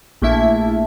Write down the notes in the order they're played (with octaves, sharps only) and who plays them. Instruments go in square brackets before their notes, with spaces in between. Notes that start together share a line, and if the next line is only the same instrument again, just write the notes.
[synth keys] A#1 A3 A#3 E4 E5 A5